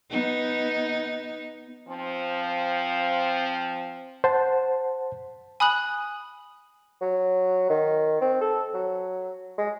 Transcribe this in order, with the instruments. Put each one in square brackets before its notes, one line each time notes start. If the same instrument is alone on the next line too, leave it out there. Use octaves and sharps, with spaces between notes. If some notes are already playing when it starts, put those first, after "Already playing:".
[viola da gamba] B3 D#4
[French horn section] F3 C4
[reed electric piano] C5 F#5 A5
[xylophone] G#5 B5 D#6 F#6 F#7
[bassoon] F#3
D#3
C4
A4
F#3
G#3